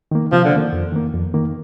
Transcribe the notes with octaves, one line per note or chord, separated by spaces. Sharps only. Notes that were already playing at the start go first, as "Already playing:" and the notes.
D#3 A#3
C3 F3
D3
D#3 A#3
F2
D#3 A#3
F2
D#3 A#3